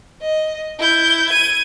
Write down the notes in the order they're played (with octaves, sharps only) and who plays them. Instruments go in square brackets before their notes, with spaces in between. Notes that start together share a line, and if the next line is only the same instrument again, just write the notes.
[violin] D#5
E4 G6
G#6 D#7